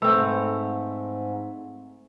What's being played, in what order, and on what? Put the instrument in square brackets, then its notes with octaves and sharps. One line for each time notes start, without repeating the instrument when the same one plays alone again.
[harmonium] G#2 [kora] A3 C4 [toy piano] B4 B5 E6